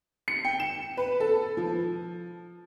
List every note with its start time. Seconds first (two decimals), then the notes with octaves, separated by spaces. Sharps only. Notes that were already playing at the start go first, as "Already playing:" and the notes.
0.28 C#7
0.45 G5
0.60 E7
0.97 B4
1.20 A4
1.57 F3